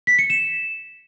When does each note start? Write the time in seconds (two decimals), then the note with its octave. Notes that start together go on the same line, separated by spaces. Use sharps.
0.07 B6
0.19 C#7
0.30 E7